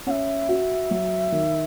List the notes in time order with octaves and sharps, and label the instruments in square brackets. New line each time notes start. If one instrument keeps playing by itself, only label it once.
[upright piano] C#4 [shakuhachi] F#5
[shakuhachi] E5
[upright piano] F#4
F#3
D#3